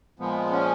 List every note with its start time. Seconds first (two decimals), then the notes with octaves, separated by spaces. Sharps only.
0.19 A#2 F3 G#3 B3
0.52 C#4